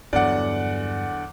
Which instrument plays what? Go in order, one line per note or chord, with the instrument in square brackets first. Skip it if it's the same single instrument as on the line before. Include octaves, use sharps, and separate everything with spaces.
[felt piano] E2 D3 F#3 [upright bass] G2 B3 [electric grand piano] D5 F#5